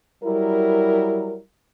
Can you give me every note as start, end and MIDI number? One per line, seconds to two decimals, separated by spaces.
0.23 1.39 54
0.23 1.39 55
0.23 1.39 64
0.23 1.39 70